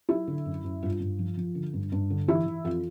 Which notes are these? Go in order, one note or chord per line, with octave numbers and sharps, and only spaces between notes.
F#3 E4
D3
F#2
F#2
G2 F4
G2
F3
F3
D3
G2
G2
D3
E3 E4
E3
F2 F4